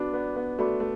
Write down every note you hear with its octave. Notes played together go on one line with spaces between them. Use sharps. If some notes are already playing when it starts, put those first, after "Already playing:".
Already playing: B3 D4 F#4 D5 D6
B3
B3
A3 F#4 D5 B5 D6
A3